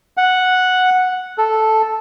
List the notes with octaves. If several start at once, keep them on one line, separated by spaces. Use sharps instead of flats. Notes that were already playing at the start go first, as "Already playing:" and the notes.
F#5
A4